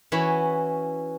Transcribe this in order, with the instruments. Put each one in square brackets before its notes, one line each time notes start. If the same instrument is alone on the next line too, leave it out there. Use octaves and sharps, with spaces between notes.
[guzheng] E3 C#4 F#4 B5